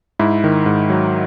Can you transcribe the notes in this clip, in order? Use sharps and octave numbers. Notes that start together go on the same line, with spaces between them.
G#2 E4
D#3
G#2
F#3